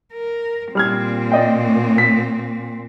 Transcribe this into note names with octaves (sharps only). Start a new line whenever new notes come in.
A#4
A#2 G3 C4 F6 G#6
D5 D#5 G5
B6